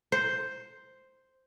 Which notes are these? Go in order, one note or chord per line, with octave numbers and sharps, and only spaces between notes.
C5